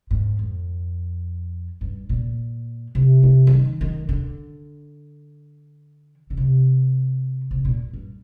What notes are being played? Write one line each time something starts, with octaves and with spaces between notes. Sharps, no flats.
G#2
F2
G2
A#2
C3
C3
F3
D#3
D#3
D3
D3
C3
C3
A#2
G2